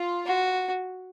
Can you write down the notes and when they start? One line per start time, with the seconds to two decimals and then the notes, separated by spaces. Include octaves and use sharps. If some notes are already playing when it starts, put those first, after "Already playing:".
Already playing: F4
0.26 F#4